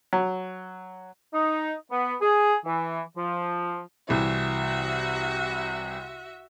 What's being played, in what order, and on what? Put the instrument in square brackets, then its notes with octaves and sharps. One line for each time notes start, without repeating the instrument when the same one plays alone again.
[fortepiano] F#3
[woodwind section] D#4
B3
G#4
E3
F3
[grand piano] C2 E3 [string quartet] F#4 E5